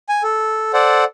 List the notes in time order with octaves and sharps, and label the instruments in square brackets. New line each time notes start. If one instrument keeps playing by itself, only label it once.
[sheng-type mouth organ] G#5
A4
A4 C5 D5 F#5